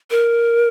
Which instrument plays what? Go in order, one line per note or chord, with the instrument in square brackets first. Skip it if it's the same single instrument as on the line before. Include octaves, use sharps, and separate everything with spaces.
[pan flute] A#4